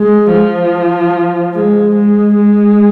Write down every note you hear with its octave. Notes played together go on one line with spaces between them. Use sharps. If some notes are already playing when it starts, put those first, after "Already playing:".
Already playing: G#3
F3
G#3
G#3
G#3